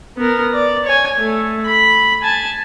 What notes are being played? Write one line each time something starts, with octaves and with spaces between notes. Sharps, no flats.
B3 A#4
D5
C#5 G#5
A3
B5
G#5 A5